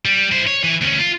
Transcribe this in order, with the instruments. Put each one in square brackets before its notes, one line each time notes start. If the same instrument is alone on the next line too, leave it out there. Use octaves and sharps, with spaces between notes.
[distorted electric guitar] G3
E4 C5
C#5
E3
D2 C#4
F4